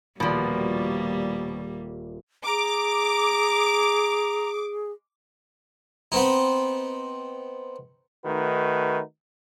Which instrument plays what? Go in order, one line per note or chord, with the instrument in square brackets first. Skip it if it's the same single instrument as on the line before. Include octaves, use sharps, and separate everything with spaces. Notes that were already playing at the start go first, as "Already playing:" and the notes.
[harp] D#1 D5 [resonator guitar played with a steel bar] B2 F3 [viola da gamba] G3 A#3
[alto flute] G#4 [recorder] A#5 [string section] D6
[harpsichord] B3 C4 D#4
[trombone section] D#3 A3 D#4 F#4 B4